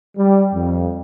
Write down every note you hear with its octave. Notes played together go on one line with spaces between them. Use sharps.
G3
F2